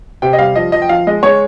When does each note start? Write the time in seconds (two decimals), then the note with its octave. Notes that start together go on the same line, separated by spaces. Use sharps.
0.22 C3 G5
0.33 D#5
0.39 G3 F5
0.56 F3 D#5
0.72 F3 D#5
0.82 G5
0.89 F3 F5
1.07 G#3 D#5
1.23 G#3 C#5